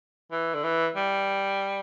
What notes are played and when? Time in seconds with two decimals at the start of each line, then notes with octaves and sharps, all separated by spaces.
0.31 E3
0.54 D3
0.64 E3
0.96 G3